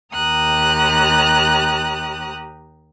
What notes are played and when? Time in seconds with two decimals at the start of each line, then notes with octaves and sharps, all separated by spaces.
0.15 D#2 G4 A#5 D#6 F#6